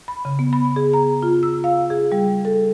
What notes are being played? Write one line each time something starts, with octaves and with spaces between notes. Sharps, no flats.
B5
C#3
B3
B5
G#4
A#5
F4
E6
F5
G#4
G3
A4